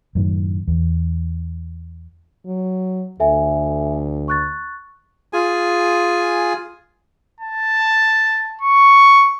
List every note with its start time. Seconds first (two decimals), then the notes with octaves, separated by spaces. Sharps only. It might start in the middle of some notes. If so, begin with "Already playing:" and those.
0.15 F#2 A2 D#3
0.67 E2
2.46 F#3
3.20 D2 A4 E5 G#5
4.28 C#6 F#6 A6
5.33 F4 G#4 G#5
7.41 A5
8.61 C#6